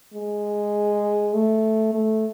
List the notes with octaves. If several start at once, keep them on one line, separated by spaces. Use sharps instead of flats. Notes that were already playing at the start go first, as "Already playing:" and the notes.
G#3
A3
A3